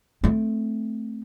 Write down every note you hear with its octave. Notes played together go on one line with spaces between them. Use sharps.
A3 C4